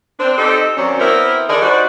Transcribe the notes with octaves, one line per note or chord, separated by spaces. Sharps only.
C4 D4
C4 D#4 G4 A4
D#3 F#3 C4 C#4 D5
B3 C4 E4 A#4
D3 D#3 G#4 D5 D#5
G3 D#4 F#4 C5 D5